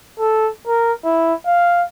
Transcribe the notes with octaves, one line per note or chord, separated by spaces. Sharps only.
A4
A#4
E4
F5